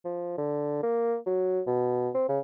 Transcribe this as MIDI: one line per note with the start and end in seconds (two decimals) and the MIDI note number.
0.05 0.36 53
0.38 0.82 50
0.83 1.16 58
1.26 1.62 54
1.67 2.10 47
2.15 2.24 60
2.29 2.39 49